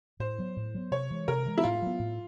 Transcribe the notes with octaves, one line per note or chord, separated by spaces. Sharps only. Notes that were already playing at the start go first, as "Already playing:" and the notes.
A2 C5
F#3 B3
A2
F#3 B3
C3 C#5
E3 G#3
C3 A#4
E3 G#3
E4
A2 F4
F#3 B3
A2